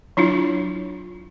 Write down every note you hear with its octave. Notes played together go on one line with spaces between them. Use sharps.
F#3 D4 E4 F4